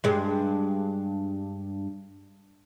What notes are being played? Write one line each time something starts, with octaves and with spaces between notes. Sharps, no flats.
G2 G#3